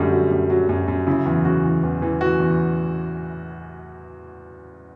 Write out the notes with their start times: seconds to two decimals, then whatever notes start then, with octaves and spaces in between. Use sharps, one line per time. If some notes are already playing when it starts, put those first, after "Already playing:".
Already playing: F#2 D3 G3 A3
0.12 F#3
0.31 F#2
0.50 F#3
0.69 F#2
0.88 F#2
1.07 C#3 E4
1.26 E2
1.45 C#3 F#4
1.64 E3
1.83 E2
2.02 E3
2.21 E3 F#4
2.40 E2